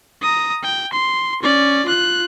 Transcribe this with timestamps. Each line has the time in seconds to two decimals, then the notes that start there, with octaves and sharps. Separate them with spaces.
0.22 A#5 D#6
0.64 G5
0.93 C6
1.42 C#4 D5
1.86 F4 F#6